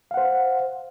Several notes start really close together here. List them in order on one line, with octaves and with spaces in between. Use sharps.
F5 F#5 C5